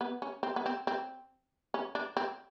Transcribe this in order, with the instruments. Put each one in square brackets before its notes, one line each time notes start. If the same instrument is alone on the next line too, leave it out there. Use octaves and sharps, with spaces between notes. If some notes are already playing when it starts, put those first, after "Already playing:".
[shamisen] B3
C#4
C4
B3
C4
C4
C#4
D4
C4